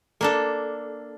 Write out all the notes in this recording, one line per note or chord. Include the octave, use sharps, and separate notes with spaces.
A#3 D4 A4